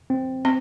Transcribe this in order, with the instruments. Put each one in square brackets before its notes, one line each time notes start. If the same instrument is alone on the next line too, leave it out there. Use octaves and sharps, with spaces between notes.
[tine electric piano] C4
[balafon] C4